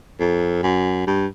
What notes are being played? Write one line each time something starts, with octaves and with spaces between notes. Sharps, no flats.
F2
F#2
G2